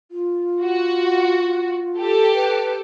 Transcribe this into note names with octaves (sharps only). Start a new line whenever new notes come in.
F4
F#4
G4 A4
B4